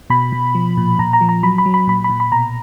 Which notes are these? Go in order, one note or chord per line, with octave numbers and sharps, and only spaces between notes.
B2 B5
B2
F3
A#2
A#2 A#5
A#5
F3
A#5
F#3 B5
B5
F#3
B5
A#2 B5
B5
A#2
B5
B2 A#5